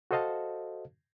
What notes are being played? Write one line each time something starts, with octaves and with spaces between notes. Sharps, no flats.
F#4 A4 C5 D#5 F5 A5